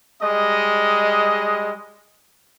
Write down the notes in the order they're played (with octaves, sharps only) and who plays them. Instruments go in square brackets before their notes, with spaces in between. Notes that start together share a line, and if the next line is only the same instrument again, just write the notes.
[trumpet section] G3 G#3 D#5